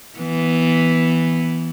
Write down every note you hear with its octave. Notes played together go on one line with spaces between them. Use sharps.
E3 B3